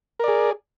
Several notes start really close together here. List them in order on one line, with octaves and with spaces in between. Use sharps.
A#4 D5 G#4